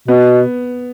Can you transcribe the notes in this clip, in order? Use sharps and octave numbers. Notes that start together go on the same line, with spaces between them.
B2 B3